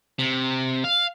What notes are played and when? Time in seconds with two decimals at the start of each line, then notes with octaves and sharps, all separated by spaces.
0.19 C3
0.84 F5